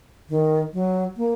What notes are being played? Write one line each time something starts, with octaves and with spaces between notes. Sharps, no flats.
D#3
F#3
A#3